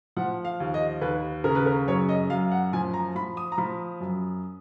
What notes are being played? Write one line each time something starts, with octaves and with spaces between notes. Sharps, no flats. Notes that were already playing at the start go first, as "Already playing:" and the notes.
F3 F#5
F5
D#2
D#5
D#2 B4
C#3 A#4
B4
A#4
F#2 C#5
D#5
F#2 F5
F#5
F3 G#5
A#5
F3 B5
D#6
A#5
F3 B5
F#2